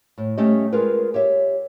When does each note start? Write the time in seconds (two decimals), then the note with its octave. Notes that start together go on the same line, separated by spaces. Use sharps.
0.18 A2
0.37 G3 A3 C#4 G4 D#5
0.73 G#3 F4 G#4 A#4 B4
1.14 G4 C#5 E5